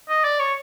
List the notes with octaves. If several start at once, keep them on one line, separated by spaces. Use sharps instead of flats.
D#5
D5
C#5